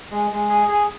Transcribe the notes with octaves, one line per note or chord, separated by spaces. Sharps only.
G#3
G#3
G#4
G#4